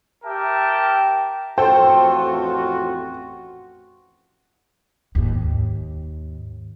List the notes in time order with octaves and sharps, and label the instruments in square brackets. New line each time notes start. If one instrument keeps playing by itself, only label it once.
[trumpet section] G4 A#4 E5 G5 A5
[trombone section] A1 F2 F#4 [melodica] F4 [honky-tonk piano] A4 C5 [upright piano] G5
[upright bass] D#2 G#2